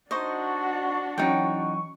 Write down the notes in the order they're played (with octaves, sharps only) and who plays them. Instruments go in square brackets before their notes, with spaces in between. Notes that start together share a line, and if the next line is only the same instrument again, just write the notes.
[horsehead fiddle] D4 F#4 [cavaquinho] D#4 C5 D#5 [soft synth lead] C#6
[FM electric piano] E3 F#3 C#4 [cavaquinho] D#4 F#5 G5